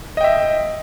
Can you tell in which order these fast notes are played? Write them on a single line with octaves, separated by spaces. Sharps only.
D#5 G5 E5